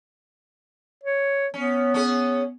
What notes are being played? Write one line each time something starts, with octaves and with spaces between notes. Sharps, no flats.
C#5
B3 C#4
C#4 G#4